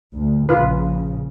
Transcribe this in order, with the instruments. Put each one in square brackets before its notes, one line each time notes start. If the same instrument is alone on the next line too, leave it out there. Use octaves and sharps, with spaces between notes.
[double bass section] D2
[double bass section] A#1 C#3 [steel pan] F4 B4